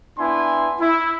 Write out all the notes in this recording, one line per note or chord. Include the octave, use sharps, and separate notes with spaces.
B3 D4 E4 G#5 C6
E4